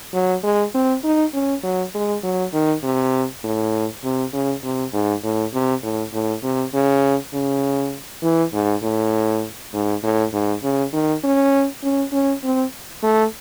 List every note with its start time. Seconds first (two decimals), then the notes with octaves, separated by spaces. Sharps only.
0.14 F#3
0.43 G#3
0.74 C4
1.04 D#4
1.34 C#4
1.63 F#3
1.94 G#3
2.24 F#3
2.53 D#3
2.83 C3
3.44 A2
4.04 C3
4.33 C#3
4.64 C3
4.93 G#2
5.24 A2
5.54 C3
5.83 A2
6.13 A2
6.43 C3
6.74 C#3
7.34 C#3
8.23 E3
8.53 G#2
8.83 A2
9.74 G#2
10.03 A2
10.33 G#2
10.63 C#3
10.93 D#3
11.24 C#4
11.83 C#4
12.12 C#4
12.43 C4
13.03 A3